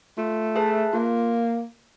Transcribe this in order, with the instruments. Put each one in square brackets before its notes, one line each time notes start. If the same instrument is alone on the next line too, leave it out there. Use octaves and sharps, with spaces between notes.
[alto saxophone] A3 [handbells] F4
[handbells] G#4 B4 E5 A5
[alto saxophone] A#3 [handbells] F4